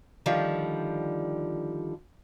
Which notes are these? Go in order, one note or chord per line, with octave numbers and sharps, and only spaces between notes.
D3 D#3 F3 G3